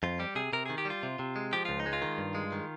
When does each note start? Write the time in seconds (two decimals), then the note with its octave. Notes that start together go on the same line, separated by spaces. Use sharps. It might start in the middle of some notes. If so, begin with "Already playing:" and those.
0.03 F2 F4
0.19 G3 G4
0.35 C3 G#4
0.53 C3 A#4
0.66 D#3 G#4
0.78 G4
0.85 G3 F4
1.03 C3
1.19 C3
1.36 G#3
1.53 F3 G4
1.65 C#2 F4
1.80 D#4
1.86 G#3
1.93 F4
2.02 D#3
2.18 G2
2.35 G#3
2.52 D#3